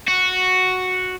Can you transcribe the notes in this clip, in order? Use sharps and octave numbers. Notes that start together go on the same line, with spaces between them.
F#4